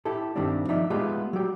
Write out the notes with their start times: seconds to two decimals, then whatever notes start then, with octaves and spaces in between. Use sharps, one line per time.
0.05 E4 G4 A4
0.36 G2 D#3 G3 A3 C4 D4
0.68 F3 D#4 D5 E5
0.90 G#3 A3 B3 F4 G4 G#4
1.33 F#3 G4